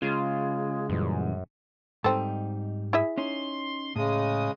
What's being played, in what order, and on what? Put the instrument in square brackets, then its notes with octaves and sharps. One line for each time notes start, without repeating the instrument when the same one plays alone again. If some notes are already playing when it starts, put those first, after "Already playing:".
[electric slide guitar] C#3 [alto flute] G#3 [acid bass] F4
[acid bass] F#2 [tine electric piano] A#2 E3 G3
[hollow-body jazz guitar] G#2 G3 D#4 [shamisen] C4 A4
[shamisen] E4 G#4 E5
[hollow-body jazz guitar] C#4 D#4 [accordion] C6
[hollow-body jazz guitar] A2 [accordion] C#3 G#3 D#6